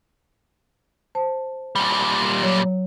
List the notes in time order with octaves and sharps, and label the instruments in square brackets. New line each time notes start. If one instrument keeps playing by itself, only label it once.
[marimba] C5 A5
[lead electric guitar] A#2 G3
[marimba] F#3 C#5